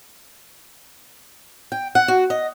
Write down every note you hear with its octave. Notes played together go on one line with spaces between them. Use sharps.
G5
F#5
F#4
D#5